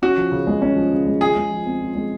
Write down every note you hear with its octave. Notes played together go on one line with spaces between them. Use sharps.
C#4 F#4
F3
C#3
G#3
C#4
F3
C#3
G#3
F4 G#4
G#3
F3
C4
F4
G#3